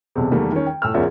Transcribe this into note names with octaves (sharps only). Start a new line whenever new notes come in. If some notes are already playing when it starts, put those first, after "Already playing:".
B1 E2 C3
E2 D#3 G3 A3 A#3
D#3 C#4
G5
A2 E6 F6
E2 G#2 C#4 F4 A#4 E5